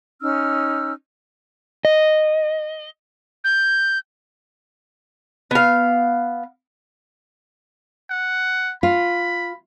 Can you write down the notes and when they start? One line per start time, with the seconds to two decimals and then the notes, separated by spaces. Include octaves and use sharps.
0.22 C#4 D#4 E6 F6
1.85 D#5
3.44 G6
5.51 B3 F5
8.10 F#5
8.83 F4 B5